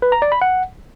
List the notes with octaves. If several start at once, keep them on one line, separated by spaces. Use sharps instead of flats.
B4
A#5
D5
B5
F#5